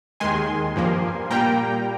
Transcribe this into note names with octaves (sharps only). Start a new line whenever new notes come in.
D#2 D#3 G#3 G#5 C6
G2 F3 A#3
A#2 G3 A#3 G5 A#5